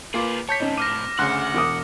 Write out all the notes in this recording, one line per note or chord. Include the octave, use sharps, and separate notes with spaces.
A#3 F4 G#4 B4 D6 C7
C#5 A5 G6 B6
A2 C4 C#4 D#4
D6 F6 A#6 D#7
D2 C#3 F#5 C6 F#6
E1 D6 D#6